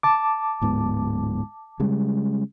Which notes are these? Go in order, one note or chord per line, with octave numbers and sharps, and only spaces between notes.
A5 D6
D1 G#2 B3
C#3 G3 G#3